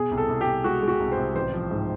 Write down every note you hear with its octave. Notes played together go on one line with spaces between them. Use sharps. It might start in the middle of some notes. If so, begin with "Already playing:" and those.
Already playing: B2 G#4
C2
A4
C2
G4
C2
G#3 F#4
G#3
F#4
C2
C5
C2
A1 C5
F3
G#2